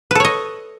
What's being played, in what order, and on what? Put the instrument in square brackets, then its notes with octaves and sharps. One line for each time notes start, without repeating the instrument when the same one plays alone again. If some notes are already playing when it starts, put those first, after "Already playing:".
[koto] B4
A4
C#5
D#5